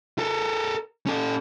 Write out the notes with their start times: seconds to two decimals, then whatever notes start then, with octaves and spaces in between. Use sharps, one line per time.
0.19 A4 A#4
1.06 C#4 A4